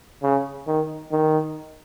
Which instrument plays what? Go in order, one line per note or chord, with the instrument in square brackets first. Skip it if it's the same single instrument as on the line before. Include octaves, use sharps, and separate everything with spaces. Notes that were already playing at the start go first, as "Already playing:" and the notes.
[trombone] C#3
D#3
D#3